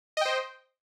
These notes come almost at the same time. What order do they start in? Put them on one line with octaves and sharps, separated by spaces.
D#5 G5 C5